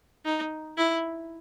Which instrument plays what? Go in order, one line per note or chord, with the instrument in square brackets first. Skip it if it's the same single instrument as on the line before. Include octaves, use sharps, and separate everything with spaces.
[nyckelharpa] D#4
E4